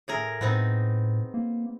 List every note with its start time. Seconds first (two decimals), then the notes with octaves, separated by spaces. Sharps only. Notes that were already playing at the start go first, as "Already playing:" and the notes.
0.08 A2 G#4 A#4
0.41 A2 B3 C4 D#4
1.34 A#3